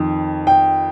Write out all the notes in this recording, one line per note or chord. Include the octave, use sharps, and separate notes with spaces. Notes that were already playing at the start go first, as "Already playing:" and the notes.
Already playing: F2 D#3
G5